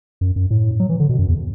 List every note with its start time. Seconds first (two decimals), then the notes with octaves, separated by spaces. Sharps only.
0.21 F#2
0.36 F#2
0.51 A2
0.80 F#3
0.89 E3
1.00 D3
1.09 B2
1.19 F#2
1.28 E2